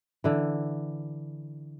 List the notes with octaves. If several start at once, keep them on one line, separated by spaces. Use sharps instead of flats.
D3 E3